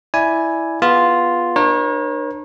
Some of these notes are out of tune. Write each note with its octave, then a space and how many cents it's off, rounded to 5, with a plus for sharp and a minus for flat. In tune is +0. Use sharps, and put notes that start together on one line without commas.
E4 -5 D5 +0 G#5 +5
B3 -5 F4 +0 G#4 +0
D4 +45 A#4 +40 C#5 -35